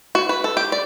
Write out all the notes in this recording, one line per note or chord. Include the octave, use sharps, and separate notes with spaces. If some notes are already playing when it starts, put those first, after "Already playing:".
F#4
B4
A4
G4
D5